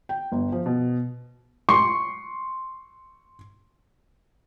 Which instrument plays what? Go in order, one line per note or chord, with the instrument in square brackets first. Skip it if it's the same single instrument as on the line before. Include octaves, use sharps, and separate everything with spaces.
[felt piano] G5
G1
F3
B2
C6 C#6